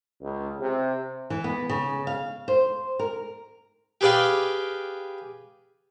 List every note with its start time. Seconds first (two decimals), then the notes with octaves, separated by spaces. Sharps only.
0.21 C#2
0.60 C3
1.30 E3
1.44 B3
1.69 C#3
2.07 F5
2.48 C5
2.99 A#4
4.01 G4 G#4 B4 D5 F5 G5